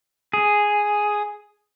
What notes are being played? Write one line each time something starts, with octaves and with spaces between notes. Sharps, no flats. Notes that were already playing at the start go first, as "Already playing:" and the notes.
G#4